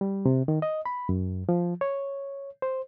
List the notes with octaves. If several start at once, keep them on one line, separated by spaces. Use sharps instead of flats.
G3
C3
D#3
D#5
B5
F#2
F3
C#5
C5